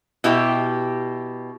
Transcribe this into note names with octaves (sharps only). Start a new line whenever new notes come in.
B2 E4 G4 G5